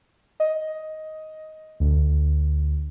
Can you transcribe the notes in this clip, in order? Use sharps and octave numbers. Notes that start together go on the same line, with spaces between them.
D#5
D2